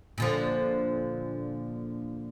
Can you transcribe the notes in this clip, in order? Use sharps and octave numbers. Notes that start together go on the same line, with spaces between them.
A#2 D3 F3